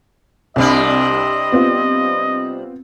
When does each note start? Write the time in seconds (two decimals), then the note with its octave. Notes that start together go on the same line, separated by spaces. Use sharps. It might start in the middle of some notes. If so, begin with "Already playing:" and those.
0.56 C2 C3 G3 C4 D4 D#5
1.52 B3 C4 F4